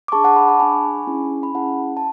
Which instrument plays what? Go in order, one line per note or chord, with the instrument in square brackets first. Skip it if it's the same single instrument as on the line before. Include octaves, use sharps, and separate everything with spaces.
[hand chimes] D6
D4 G#4 A5 C#6
F#5 A5
B5 D6
A5 C#6
D4 G#4 G#5 B5
C#4 E4 G#4
B5
C#4 E4 G#4 F#5 A5
A5